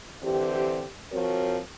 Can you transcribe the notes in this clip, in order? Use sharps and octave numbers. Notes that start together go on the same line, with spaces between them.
D3 E3 C4 G4
F3 C4 F#4 A#4 C#5